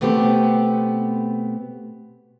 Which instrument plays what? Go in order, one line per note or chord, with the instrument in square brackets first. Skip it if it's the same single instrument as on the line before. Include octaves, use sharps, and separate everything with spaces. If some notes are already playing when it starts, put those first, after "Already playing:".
[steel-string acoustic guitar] B2 A3 B3 C4 G4